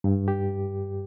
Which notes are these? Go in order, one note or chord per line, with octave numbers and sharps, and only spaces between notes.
G2
G4